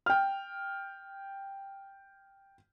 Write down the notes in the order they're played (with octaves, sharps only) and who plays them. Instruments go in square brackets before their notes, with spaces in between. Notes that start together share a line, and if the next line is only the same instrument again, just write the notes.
[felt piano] G5 F6